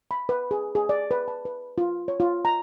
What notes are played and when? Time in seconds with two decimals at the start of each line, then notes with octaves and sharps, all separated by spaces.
0.11 B5
0.29 B4
0.51 G#4
0.75 G#4
0.89 D5
1.11 B4
1.28 A5
1.45 B4
1.78 F4
2.08 C#5
2.20 F4
2.45 A#5